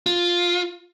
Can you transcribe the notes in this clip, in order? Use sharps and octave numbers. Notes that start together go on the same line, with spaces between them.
F4